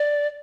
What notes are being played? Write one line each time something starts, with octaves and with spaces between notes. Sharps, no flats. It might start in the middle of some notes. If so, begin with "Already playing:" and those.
Already playing: D5